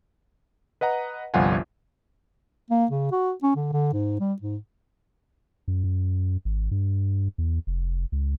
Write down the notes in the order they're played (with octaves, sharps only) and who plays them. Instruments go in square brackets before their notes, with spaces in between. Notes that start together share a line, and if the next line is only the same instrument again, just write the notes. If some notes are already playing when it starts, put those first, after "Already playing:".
[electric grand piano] B4 D#5 F#5 A#5
G1 C2 F3 F4 F#5 G#5
[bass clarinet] A#3
C#3
F#4
C#4
D3
D3
G#2
G3
G#2
[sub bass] F#2
F#2
G#1
G2
E2
F1
C#2